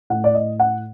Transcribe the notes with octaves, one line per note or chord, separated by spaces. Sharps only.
A2 F#5
D5
D#5
F#5